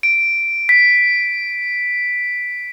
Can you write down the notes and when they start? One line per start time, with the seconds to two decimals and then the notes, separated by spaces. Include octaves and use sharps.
0.03 D7
0.69 B6